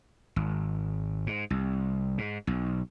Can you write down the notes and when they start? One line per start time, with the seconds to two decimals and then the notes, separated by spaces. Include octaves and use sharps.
0.36 G#1
1.26 G#2
1.50 C2
2.18 G#2
2.47 B1